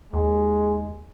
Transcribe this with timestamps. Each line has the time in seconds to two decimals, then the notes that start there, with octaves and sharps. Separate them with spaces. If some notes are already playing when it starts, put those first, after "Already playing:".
0.13 D#2 G#3